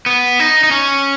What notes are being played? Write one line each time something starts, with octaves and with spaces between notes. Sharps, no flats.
B3
D#4
D#4
C#4